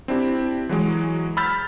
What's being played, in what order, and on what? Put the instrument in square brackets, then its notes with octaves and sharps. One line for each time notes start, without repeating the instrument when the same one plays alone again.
[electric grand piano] C4 D4 E4 G4
E3 F#3 G#3
B5 E6 F6 G6 A6 B6